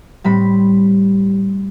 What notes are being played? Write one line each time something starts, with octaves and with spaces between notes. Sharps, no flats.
A2 G3 C4 B5